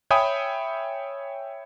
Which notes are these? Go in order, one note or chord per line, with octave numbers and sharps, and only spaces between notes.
C#5 E5 G5 G#5 B5 D#6